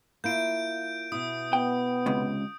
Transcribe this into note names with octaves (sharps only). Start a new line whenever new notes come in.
A#3 E4 F4 G6 D7
B2 E4 D#6
B3 G5
C#2 C3